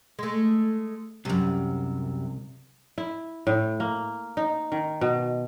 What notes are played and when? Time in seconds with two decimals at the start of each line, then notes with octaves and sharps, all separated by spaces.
0.19 G#3 A3
1.25 C2 F#2 C3
2.98 E4
3.47 A2
3.80 A#3
4.37 D#4
4.72 D#3
5.01 B2